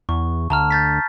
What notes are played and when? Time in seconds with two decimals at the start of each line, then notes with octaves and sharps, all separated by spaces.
0.09 E2 C#6
0.50 D2 A5 A#5 F6
0.71 G6 A6 B6